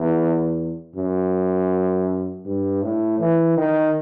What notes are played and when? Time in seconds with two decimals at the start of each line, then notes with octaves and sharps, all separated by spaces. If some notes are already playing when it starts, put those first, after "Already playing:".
Already playing: E2
0.96 F#2
2.46 G2
2.82 A2
3.19 E3
3.57 D#3